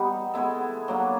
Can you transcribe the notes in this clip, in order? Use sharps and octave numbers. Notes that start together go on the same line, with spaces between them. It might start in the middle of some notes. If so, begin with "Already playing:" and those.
Already playing: G3 B3 D#4
G#3 B3 E4 A4
F#3 A#3 D4